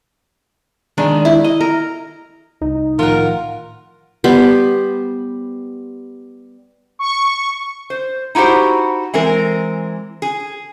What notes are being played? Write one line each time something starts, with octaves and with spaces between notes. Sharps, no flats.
D#3 G#3 D4
E4
D#5
A#4
C2 D#4
A2 D#3 F3 F4 A#4 F#5
G3 B3 C5
C#6
C5
D#4 E4 F#4 G4 C5
E3 G#3 C4 A#4
G#4